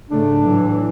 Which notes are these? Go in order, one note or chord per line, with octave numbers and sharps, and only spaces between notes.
G#2 C#3 A3 D4
A2 E3 F#3